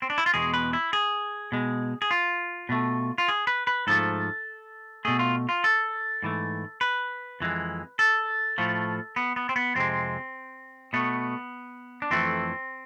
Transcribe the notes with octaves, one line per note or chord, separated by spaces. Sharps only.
C4
D4
E4
F4
E2 B2 G#3 G#4
B4
E4
G#4
B2 G#3
G#4
F4
B2 A3
F4
G#4
B4
B4
G#2 F3 A3 A4
B2 A3 G#4
F4
F4
A4
G#2 E3 A3
B4
F2 E3 G#3
A4
A2 F3 A3
B3
B3
C4
B3
F2 C3 G#3 C4
B2 A3 B3
D4
F2 E3 A3 C4